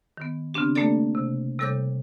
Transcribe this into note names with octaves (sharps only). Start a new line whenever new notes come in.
D#3 B3
C#3 B3 C4 D4 G4
A3 A#3 D4 G4 A4 D5
C3
C3 G3 A4 C#5 D6 G6